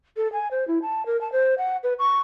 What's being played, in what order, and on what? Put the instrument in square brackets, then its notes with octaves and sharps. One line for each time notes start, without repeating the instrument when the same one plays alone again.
[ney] A4
G#5
C5
E4
A5
A#4
A5
C5
F#5
B4
C#6